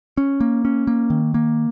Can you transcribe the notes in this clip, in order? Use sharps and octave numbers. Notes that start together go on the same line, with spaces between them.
C#4
A#3
C#4
A#3
D#3
A#3